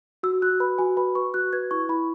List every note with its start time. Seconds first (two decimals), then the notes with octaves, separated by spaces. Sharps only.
0.23 F#4 E6
0.42 F#4 F#6
0.60 B4 B5
0.78 F#4 G#5
0.97 B4 B5
1.15 B4 C#6
1.34 F#4 F#6
1.53 B4 G#6
1.71 E4 C#6
1.89 E4 B5